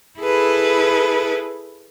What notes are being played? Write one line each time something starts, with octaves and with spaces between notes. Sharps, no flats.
E4 G#4 A4 B4